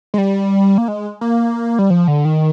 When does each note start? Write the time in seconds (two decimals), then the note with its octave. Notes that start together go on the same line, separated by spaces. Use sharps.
0.14 G#3
0.18 G3
0.78 A#3
0.88 G#3
1.21 A#3
1.79 G3
1.90 F3
2.08 D3
2.25 D#3